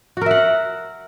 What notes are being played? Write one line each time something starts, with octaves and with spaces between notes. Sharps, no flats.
F#4 A#4 E5 F#5